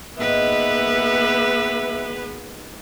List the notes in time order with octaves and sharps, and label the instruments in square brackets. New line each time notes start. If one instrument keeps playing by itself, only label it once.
[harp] G#1 D#5 [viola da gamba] A#3 B4 [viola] B3 G#4 [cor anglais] E5